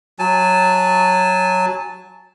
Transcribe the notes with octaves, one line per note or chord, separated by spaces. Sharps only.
F#3 G#5 A5